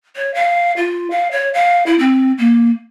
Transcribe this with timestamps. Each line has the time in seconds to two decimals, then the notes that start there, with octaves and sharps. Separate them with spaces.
0.16 C#5
0.34 F5
0.77 F4
1.11 F5
1.32 C#5
1.54 F5
1.86 E4
1.99 C4
2.38 A#3